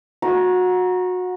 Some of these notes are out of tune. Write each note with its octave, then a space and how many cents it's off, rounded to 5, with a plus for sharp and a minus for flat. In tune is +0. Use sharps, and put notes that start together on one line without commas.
F#4 -25 A#5 +20